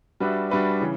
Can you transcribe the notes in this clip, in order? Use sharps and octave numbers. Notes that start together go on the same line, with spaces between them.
G3 D4 F#4 B4 E5
G3 D4 F#4 B4 E5
C#3 E3